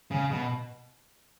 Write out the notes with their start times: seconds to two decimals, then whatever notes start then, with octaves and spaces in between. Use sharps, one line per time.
0.11 C#3
0.31 B2